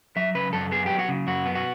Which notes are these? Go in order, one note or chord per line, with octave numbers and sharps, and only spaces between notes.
F#3 E5
C#3 B4
F#2 A4
B3 G#4
F#3 G4
F#4
C#3
F#2 F#4
B3
F#4